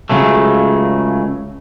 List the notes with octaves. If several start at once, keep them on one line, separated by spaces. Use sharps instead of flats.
C#2 G#2 C#3 F#3 A3